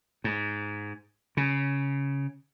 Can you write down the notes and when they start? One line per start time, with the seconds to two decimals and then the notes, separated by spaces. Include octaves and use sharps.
0.24 G#2
1.37 C#3